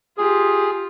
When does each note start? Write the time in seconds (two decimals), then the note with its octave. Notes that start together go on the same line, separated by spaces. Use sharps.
0.18 F4 G4 G#4